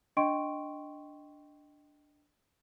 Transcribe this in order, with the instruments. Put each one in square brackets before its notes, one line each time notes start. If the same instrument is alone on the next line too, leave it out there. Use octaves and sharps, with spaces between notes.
[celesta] D4 D#5 G5 C6 C#6 D7